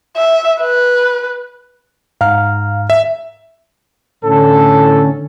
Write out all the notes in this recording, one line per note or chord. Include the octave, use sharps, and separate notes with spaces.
E5
B4
G#2 F5 A#5 F6
E5
A2 D3 C#4 A4